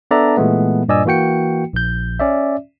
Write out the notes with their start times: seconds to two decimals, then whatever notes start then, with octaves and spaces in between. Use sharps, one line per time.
0.11 B3 D4 A4 D5 E5 A#5
0.37 A#2 E3 G#3 A3 B3
0.88 G2 A#2 D5 D#5 G#5 E6
1.05 E3 A#3 F#4 G5 C#7
1.73 A#1 G6
2.19 C#4 D5 E5